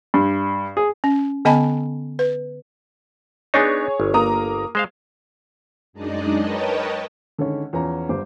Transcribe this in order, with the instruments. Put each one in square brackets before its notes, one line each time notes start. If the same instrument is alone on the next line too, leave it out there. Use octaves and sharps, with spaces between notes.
[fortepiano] G2
G#4
[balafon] C#4
D3 B3 D#5 G#5 A5 B5
B4
[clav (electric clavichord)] B3 D4 D#4 [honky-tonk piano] G#4 C#5
[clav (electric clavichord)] G1
[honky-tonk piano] A#3 A#5 D#6
[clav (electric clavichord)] G#3 C5 F5
[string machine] F#2 G#3 D4 D#4 D5 D#5
A#4 B4 C#5 D#5 G5 A5
[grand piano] D3 D#3 G#3 C#4 C#5
E2 F3 C#4 A#5
G1 G3 C5 D6